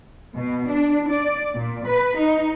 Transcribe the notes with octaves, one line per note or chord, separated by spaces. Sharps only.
B2
D4
D5
A#2
B4
D#4